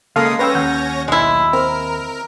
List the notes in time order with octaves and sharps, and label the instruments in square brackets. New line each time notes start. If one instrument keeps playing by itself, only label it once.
[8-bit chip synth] C#3 A#3 D#6 [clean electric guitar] G#3 [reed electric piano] A4 F5
[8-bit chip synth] C#4 C#5 A#6 [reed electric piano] B4 G5 E6
[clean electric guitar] D#2 [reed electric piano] F#5 G6
[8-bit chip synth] B1 [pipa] G#3 E4
[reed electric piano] C4 [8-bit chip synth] A#4